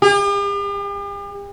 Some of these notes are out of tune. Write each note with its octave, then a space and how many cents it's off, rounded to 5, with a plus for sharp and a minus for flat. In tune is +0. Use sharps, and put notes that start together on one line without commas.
G4 +45